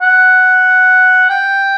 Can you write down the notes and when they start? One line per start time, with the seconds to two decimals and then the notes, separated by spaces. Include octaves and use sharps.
0.01 F#5
1.30 G5